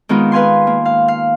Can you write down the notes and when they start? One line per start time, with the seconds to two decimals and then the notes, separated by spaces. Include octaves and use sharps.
0.09 D#3 G#3 B3 D#4 F4
0.32 B4 F5 G#5 C6
0.67 A#3
0.85 F5
1.08 F5